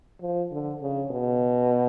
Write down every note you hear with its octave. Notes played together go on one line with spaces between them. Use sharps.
F3
D3
C#3
B2